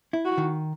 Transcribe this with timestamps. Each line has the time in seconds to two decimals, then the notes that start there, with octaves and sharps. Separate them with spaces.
0.13 E4
0.25 F#4
0.38 D#3